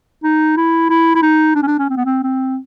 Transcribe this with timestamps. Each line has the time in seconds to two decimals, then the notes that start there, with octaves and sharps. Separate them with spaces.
0.24 D#4
0.57 E4
0.90 E4
1.15 E4
1.22 D#4
1.56 D4
1.62 C#4
1.67 D4
1.79 C#4
1.90 C4
1.97 B3
2.06 C4
2.23 C4